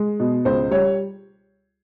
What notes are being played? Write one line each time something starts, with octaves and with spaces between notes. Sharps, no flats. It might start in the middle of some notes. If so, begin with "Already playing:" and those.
Already playing: G#3
B2
C#2 C5
G3 C#5